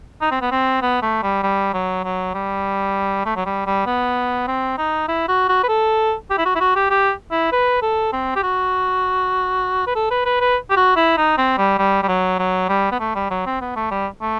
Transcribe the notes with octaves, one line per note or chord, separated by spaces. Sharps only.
D#4
C4
B3
C4
B3
A3
G3
G3
F#3
F#3
G3
A3
F#3
G3
G3
B3
C4
D#4
E4
F#4
F#4
B4
A4
G4
E4
F#4
E4
F#4
G4
G4
E4
B4
A4
C4
G4
F#4
B4
A4
B4
B4
B4
G4
F#4
E4
D#4
C4
G3
G3
G3
F#3
F#3
G3
B3
A3
G3
F#3
C4
B3
A3
G3
A3